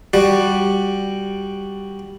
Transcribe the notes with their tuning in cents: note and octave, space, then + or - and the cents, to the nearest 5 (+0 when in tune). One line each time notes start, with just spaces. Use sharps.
G3 +0 F#4 +0 D5 +0